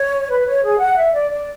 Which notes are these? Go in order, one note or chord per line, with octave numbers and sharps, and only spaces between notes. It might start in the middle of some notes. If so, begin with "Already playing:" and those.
Already playing: C#5
B4
C#5
G#4
F#5
E5
D5
D5